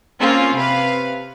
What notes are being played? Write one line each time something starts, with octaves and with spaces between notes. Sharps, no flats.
A#3 C4 C#4 F4
C3 B4 F5